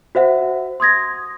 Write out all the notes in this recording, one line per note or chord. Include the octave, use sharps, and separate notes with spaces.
F#4 C5 E5 F#5
C6 D#6 G#6 A#6